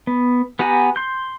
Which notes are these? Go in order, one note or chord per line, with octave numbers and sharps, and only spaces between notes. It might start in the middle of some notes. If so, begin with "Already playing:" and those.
B3
B3 G4 F#5 G#5 A#5
C6 G6